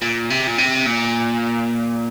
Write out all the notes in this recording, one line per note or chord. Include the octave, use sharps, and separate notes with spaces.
A#2
C3
A#2
C3
A#2